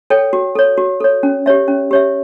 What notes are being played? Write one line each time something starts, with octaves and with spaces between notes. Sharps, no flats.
A4 C#5 G5
F#4
A4 C#5
F#4
A4 C#5
C#4
G4 C#5 E5
C#4
G4 C#5 E5